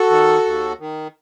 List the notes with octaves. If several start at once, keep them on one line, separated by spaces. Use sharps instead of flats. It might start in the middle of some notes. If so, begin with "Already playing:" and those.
Already playing: F#4 A4
D#3
D#2
D#3